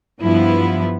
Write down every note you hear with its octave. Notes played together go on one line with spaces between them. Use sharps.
G2 F3 B3 E4